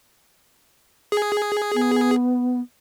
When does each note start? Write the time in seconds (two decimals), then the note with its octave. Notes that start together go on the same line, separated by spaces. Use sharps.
1.12 G#4
1.74 B3